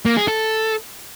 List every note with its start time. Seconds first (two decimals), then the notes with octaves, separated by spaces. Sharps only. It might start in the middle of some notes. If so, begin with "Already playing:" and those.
0.06 A#3
0.17 G#4
0.28 A4